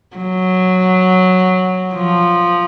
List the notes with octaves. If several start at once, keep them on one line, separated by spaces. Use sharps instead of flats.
F#3
F3